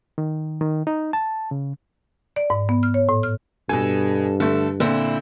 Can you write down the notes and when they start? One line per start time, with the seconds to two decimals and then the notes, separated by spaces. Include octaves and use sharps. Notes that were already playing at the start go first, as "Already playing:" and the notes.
0.18 D#3
0.61 D#3
0.87 D#4
1.13 A5
1.51 C#3
2.36 D5
2.50 G#2
2.69 B3
2.83 F6
2.94 C#5
3.09 A2
3.23 F6
3.69 G2 B2 A4 G#5
4.40 D3 A3 A4
4.80 A#2 D3 C4 E4